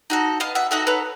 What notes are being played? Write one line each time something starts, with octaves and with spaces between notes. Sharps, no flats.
D#4 F#4 A4
B3 D#5 F5
E5 F#5
D#4 F#4 A4 E5 F#5
B4 C#5